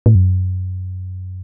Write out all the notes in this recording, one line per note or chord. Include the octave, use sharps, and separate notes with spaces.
A2
F#2